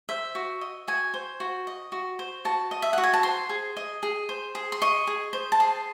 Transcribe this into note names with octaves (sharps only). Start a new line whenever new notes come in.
C5 E5
F#4
D#5
F#4 G#5
C5
F#4
D#5
F#4
C5
F#4 A5
D#5
E5
F#4 F#5
G#5
A5
C5 C6
G#4
D#5
G#4
C5
G#4
C6
D#5 C#6
G#4
C5
A5
G#4 C6